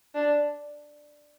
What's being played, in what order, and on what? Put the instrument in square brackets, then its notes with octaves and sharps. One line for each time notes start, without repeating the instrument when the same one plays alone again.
[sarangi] D4